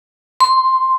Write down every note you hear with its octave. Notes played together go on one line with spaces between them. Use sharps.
C6